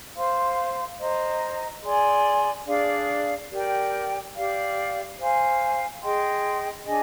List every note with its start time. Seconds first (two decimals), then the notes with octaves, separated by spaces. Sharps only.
0.15 C5 F5 C6
1.00 C5 D#5 A#5
1.83 G#4 D5 G#5 C6
2.66 D4 G#4 D5 F5
3.51 G4 A#4 D5 G5
4.35 G4 D5 F5
5.18 C5 F5 G#5
6.02 G#4 D#5 G5 C6
6.85 D4 G#4 D#5 G#5